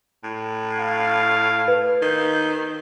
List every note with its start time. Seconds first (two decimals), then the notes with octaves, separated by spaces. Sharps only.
0.24 A2
0.79 F5
1.68 B4
2.02 D#3 G6